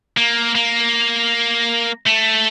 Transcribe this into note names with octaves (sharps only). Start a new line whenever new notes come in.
A#3
A#3
A3